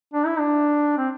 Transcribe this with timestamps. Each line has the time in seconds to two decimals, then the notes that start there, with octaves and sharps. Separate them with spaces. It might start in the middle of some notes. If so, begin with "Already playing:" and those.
0.14 D4
0.26 E4
0.39 D4
0.97 C4